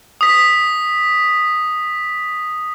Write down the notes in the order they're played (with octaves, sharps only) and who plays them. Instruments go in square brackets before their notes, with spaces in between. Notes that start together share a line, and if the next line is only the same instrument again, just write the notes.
[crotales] D#6 B6